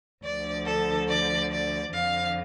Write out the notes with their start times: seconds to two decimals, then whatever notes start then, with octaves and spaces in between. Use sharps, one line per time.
0.24 D2 D3 F3 D5
0.66 A4
1.09 D5
1.51 D5
1.94 F2 D3 F3 F5